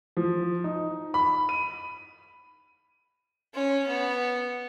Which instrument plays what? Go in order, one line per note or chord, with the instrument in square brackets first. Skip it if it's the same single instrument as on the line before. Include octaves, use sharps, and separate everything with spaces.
[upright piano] F3
D#4
B5
D#7
[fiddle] C#4
B3